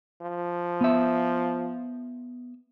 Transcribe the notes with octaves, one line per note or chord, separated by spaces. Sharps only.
F3
B3 E5